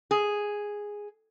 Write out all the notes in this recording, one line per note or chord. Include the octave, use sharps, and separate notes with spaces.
G#4